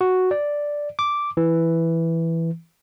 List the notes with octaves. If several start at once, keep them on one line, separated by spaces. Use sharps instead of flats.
F#4
D5
D6
E3